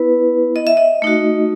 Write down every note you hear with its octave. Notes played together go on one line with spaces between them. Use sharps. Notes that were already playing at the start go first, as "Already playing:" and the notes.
Already playing: B3 E4 B4
D#5
E5
D#5
A3 D#4 F#4